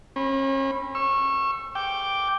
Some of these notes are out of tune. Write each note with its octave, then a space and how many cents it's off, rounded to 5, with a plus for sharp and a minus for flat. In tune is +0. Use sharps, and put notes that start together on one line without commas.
C#4 -40 B5 +0
C#6 -20 E6 +25
G5 +0 D6 +0